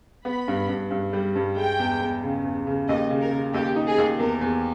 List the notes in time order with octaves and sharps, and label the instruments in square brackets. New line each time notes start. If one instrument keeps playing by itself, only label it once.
[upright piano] B3 [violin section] B5
[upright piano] G2
G2
G2
G3
G2
[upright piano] G#3 [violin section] G5
[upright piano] E2
E2
C#3
E2
C#3
[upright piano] D#2 [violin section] D#5
[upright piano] C#3
[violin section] A#4
[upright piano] C#3
[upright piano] D#2 [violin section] G4
[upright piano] D#4
[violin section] G#4
[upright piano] D#2
[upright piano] E2 [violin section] A#4
[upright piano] E2